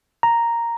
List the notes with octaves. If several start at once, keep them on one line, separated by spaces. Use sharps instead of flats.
A#5